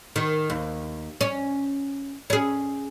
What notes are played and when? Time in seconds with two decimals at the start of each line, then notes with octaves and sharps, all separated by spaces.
0.16 D#3
0.50 D#2
1.21 C#4
2.30 C#4 G#4